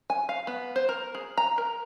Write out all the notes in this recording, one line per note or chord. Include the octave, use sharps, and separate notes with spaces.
G#5
F5
B3
C5
A#4
G#4
A#5
A#4